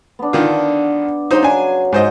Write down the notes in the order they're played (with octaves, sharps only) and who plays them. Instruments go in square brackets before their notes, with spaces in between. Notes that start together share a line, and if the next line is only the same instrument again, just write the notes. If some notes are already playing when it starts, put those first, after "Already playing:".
[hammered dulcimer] B3 D4
[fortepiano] D3 D#3 F4
[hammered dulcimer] C#3 F#3 C6 [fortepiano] D#4 C5
[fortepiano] D4 G#5
G#2 C5 D#5